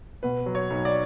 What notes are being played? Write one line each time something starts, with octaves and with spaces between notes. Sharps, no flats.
B2 B4
F#3
C#5
B1
D5